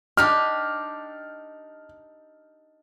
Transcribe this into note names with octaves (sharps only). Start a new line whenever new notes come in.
D4 D#4 G4 F6